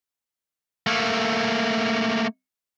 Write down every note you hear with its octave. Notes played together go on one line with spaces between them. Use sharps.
A3 A#3